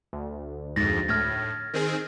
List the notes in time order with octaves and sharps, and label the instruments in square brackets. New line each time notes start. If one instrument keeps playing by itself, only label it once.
[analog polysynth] D2
[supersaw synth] F2 G#2 [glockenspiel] A6 A#6
[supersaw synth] A2 [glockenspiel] F6 G#6 A#6
[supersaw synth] D#3 C4 G#4